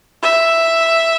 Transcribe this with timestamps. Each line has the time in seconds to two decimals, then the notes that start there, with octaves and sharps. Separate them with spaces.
0.23 E5